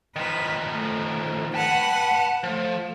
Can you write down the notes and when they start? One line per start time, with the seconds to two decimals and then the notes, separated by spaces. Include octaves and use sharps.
0.16 D#3 F3 B4
0.71 A3
1.54 B4 F#5 G5 A5
2.44 F3 A3